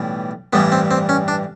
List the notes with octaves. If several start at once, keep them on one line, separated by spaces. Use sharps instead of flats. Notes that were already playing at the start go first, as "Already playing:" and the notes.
Already playing: B1 A2 E3 G3
A1 G2 E3 G3 B3
C4
C4
C#4
D4